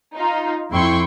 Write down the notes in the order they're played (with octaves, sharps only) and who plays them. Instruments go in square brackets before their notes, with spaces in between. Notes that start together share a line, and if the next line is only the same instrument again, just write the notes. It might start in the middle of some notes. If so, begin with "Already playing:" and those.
[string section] D#4 F4
F2 E4 G5 C6 C#6